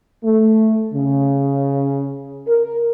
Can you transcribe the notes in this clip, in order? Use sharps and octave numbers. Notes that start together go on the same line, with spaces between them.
A3
C#3
A#4